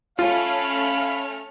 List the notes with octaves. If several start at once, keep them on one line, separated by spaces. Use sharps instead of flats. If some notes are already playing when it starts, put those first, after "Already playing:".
A3 C#4 F4 F5 B5 F6